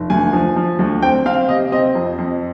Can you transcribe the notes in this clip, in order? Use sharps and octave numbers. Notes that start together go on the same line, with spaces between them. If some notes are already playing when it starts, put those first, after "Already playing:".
Already playing: F1
D2 G#5
F3
F3
D2
C4 G5
C4 F5
C3 D#5
C4 D#5
F2
F2